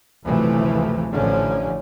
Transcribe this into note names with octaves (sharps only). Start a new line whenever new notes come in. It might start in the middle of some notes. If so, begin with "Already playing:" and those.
F#1 D2 C3 E3 F3 A3
A1 D3 F3 A3 C#4